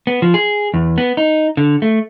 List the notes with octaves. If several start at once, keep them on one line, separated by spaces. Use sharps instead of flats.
B3
F3
G#4
E2
B3
D#4
D3
A3